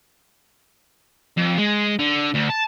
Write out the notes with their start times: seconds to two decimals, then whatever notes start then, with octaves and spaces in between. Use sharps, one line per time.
1.37 F2
1.58 G#3
1.99 D3
2.34 D2
2.49 A5